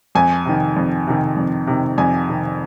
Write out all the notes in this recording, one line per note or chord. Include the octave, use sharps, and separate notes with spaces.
F2 G#5
C3 D#3
F2
C3 D#3
F2
C3 D#3
F2 G#5
C3 D#3